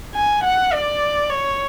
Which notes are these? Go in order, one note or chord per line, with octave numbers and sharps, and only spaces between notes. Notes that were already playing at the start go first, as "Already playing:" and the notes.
G#5
F#5
D5
C#5